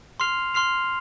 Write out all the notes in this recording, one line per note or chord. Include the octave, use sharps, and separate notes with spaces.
C6 F6 C7 F7
C6 F6 C7 F7